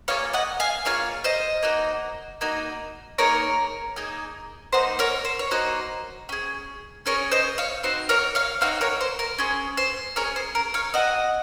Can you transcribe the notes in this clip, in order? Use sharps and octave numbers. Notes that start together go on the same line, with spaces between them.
A#3 F4 G#4 C#5 F5
D#5 F#5
F5 G#5
A#3 F4 G#4 C#5 F5
C5 D#5
A#3 D#4 F#4
A#3 D#4 F#4
A#3 D#4 G#4 A#4 C#5
A#3 D#4 G#4
A#3 D#4 F#4 C5
A#4 C#5
C5
C#5
A#3 D#4 F#4 C5
C#4 G#4
C#4 G#4 A#4 C#5
C5 D#5
C#5 F5
C4 D#4 F#4 C5
A#4 C#5
C#5 F5
C4 D#4 F#4 C#5 F5
A#4 C#5
C5
A#4
C#4 G#4 C5
C5
C#4 G#4 A#4 C#5
C5
A#4
C#5 F5
C4 F#4 D#5 F#5